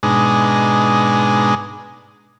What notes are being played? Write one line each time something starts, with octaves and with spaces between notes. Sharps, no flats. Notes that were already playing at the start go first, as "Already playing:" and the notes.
G#2 B2 G#3 D4 D#4